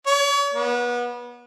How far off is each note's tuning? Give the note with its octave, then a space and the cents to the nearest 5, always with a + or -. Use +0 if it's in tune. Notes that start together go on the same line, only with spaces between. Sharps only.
C#5 +40
B3 -30